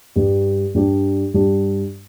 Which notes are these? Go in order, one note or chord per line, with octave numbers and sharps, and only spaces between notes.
G2 G3 D4 G4
G2 G3 D4 G4
G2 G3 D4 G4